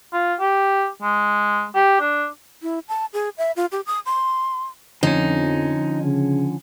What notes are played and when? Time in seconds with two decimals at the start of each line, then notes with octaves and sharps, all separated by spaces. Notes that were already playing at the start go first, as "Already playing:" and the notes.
0.13 F4
0.40 G4
1.02 G#3
1.75 G4
2.00 D4
2.62 E4
2.88 A5
3.13 G#4
3.38 E5
3.56 F4
3.72 G4
3.87 D#6
4.06 C6
5.03 F2 D3 F3 C#4 D#4
6.04 C#3